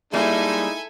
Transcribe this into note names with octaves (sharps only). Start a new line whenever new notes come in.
G3 G#3 A#3 D#4 E4 A4 E5 G#5